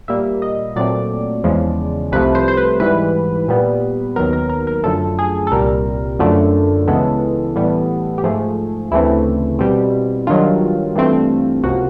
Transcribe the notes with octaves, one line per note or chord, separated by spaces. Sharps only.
A#2 G3 A#3 E5
D#5
A#2 F#3 A3 C4 D5
E2 C#3 F3 G#3
C2 C3 F3 A3 B4
C5
C5
B4
G#2 E3 G3 B4
A#2 G3 B3
D#2 D#3 F#3 B3 A#4
A#4
A#4
A#4
F#2 D3 F3 A3 A4
G#4
A4
C2 A#2 G3 A#4
F#2 D3 F3 A3
C#2 C#3 E3 G#3 B3 A4
A2 E3 G3 B3
G4
G#2 F3 A3 G#4
D2 C#3 E3 A3 C4 E4
B2 G3 C4
G2 D#3 F#3 F4
G2 E3 A3 C4
C#2 C3 F3 A#3 F#4